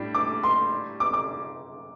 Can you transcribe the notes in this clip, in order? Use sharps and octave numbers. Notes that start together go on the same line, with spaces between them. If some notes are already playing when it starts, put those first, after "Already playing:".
Already playing: A2 G3 D4 G4
D6
C6
D6
D6